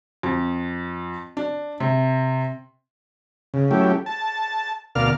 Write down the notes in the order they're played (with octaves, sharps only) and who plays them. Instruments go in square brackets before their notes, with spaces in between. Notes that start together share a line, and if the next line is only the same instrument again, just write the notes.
[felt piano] F2
D4
C3
[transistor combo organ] C#3
F#3 A3 C#4 E4 G4
A5
D2 B2 A#4 D5 F5 F6